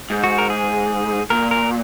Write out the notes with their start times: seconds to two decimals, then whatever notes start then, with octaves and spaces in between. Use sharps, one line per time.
0.10 G#2
0.24 F#4
0.38 A#4
0.50 G#4
1.30 A#2 A#4
1.51 A#4